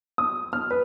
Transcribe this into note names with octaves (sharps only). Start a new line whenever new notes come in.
D#6
F6
B4